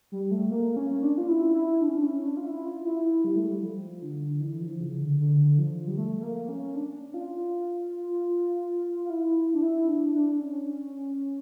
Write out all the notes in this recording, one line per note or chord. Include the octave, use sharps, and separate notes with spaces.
G3
A3
A#3
C#4
D4
F4
E4
E4
D4
C#4
D4
C#4
D4
F4
E4
F4
E4
G3
A3
G3
F3
D3
E3
F3
C#3
D3
D3
F3
G3
A3
A3
A#3
C#4
D4
F4
F4
E4
D4
E4
D4
D4
C#4